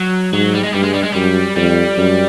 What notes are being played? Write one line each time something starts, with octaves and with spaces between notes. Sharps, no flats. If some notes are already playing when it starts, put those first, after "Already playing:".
Already playing: F#3
G#2 F#3
G3
G#3
G2 G3
G#3
G3
G#3
F#2 G3
F2 G3
F#2